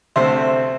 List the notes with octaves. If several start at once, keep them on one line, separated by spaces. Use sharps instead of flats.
D2 C3 A3 C4 C5 E5